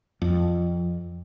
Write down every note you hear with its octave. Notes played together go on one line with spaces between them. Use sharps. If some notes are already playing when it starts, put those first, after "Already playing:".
F2